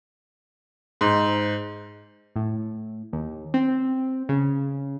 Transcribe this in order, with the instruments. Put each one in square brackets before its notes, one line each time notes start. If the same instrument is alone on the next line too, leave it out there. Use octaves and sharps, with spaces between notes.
[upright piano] G#2
[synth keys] A2
D#2
C4
C#3